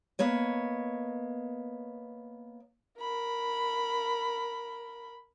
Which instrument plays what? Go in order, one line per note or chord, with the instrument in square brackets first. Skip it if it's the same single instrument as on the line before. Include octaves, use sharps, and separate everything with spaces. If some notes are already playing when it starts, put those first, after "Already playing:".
[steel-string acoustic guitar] A#3 B3 C#5 D#5
[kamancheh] A#4 B5